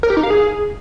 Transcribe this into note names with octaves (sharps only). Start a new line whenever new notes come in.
A#4
G4
D#4
F5
G#4